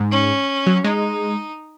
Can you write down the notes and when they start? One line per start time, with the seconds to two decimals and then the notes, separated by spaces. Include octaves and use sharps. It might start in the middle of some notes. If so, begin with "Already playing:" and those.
Already playing: G#2
0.11 C#4
0.66 F#3
0.84 G#3 D#4